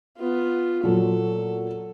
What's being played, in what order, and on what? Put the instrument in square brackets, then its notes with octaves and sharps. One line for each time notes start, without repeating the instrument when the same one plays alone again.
[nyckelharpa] B3 F4
[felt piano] A#2 F#3 [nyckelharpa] A4